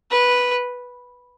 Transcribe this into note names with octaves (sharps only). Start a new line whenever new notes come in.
B4